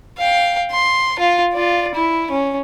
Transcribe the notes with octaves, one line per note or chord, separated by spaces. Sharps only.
F5 G5
C6
F4 F5
F4 D5
E4
C#4